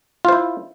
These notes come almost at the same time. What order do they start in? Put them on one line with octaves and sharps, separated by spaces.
F4 C5 E4